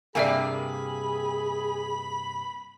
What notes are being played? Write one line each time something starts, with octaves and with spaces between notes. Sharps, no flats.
G2 C3 A#3 G#4 D5 E5 G#5 B5